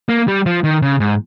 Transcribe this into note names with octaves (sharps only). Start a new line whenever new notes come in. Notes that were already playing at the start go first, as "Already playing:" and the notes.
A#3
G3
F3
D#3
C#3
G#2